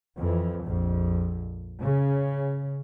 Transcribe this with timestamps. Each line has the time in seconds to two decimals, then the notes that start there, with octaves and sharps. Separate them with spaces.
0.16 F2 E3
0.64 A#1 F2
1.81 C#3